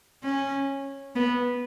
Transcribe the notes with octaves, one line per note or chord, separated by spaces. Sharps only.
C#4
B3